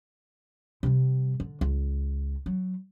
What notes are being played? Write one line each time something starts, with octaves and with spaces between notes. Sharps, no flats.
C3 G3
D3
C#2
F#3